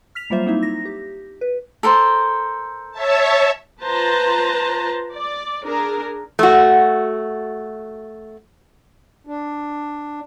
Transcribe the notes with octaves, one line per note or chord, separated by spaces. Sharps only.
F6 B6 F7
F#3 G3 A#3 F4 C5 E5
A#3 C4 D#4 E4 E5
A#6
G4
B4
A4 A#4 C5
C#5 E5 A5
F4 B4 C5 A5 A#5
D5
D4 G#4 A#4
A3 F#4
D4